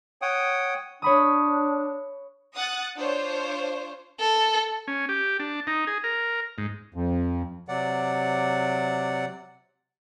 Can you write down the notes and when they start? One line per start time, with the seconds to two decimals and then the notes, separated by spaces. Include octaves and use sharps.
0.22 C#5 F#5 G5 D#6
1.02 D4 C#5 B5 D#6
2.54 F#5 D#6 F#6 A6
2.96 D4 F4 C5 C#5
4.20 A4
4.88 C#4
5.09 G4
5.40 D4
5.67 D#4
5.87 G#4
6.04 A#4
6.58 G#2
6.94 F2
7.68 C3 F#3 D5 F#5